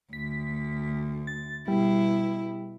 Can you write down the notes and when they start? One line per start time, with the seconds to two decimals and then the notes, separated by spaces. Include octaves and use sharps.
0.13 D2 B6
1.27 A6
1.68 B2 G3 E4